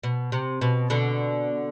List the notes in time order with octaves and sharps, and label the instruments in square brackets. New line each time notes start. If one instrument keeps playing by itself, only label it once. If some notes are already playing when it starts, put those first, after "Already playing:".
[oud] B2
C3
B2
B2 D3